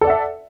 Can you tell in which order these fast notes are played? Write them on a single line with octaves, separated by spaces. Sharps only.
A4 D5 F#5 E5